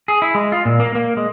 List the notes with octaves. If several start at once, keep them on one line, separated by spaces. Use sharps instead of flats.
G#4
E4
G#3
F4
A#2
A#3
A#3
G#3